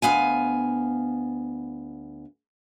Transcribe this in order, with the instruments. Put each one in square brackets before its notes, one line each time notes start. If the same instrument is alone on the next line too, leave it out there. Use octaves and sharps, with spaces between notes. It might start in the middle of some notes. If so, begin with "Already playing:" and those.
[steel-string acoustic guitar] D2 B3 F5 G#5